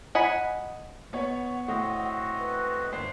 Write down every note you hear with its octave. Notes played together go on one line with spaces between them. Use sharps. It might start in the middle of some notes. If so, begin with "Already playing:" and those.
D#5 F#5 G#5 B5
B3 C#5 F#5
A2 C4 F#4 D#5
B4
G1 C5 C7